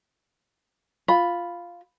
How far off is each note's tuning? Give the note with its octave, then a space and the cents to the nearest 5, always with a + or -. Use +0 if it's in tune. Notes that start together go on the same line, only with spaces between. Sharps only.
F4 +0 B5 +0